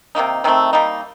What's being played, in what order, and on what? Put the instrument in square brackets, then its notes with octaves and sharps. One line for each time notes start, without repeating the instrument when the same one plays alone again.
[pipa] C3 D#3 A#3 D#4
C3 D#3 A3 C4
G3 A#3 D#4